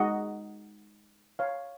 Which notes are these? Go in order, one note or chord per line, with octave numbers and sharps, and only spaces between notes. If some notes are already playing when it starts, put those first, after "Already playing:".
Already playing: G#3 D#4 F#4 D#5 F#5
C#5 F5